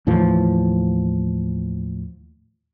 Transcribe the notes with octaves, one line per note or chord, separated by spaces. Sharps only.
D#2 A2 E3 F3